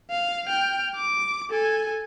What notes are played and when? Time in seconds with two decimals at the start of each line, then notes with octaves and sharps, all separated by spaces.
0.10 F5
0.46 G5 F6
0.96 D6
1.51 A4 G#5